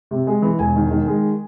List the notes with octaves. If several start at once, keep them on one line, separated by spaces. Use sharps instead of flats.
C3
G#3
E3
E1 G#5
D#3
D#3
G#3